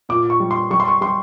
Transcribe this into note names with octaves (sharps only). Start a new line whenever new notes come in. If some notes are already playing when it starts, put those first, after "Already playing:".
A#2 D6
C#6
G3
C6
G3 C#6
C6
C#6
G3 C6